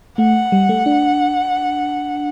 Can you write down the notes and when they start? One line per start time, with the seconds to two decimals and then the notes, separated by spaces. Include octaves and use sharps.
0.18 A3 F#5
0.52 G3
0.69 A3
0.86 D4